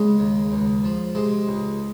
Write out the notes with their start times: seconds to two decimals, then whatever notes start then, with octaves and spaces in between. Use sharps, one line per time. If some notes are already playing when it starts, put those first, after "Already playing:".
Already playing: C#3 G#3
0.19 D#2
0.52 C#2
0.84 F3
1.15 C3 G#3
1.47 C#2